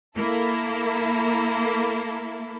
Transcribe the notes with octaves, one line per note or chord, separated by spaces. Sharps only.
A#3 E4 A4